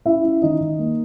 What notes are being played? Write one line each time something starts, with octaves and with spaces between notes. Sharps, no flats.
C#4 E4 E5
C#4
D#3 D#4 D#5
D#3
A#3